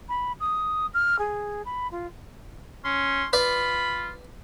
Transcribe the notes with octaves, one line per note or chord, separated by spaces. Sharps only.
B5
D#6
F6
G#4
B5
F4
C#4 C6
F4 B4 D5 B5